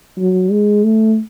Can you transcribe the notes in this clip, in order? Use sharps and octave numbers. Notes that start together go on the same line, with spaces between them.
F#3
G#3
A3